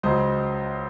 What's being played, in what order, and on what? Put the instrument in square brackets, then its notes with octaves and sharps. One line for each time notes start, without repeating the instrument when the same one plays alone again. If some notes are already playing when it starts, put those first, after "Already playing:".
[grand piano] C#2 C#3 F#3 C5 D#5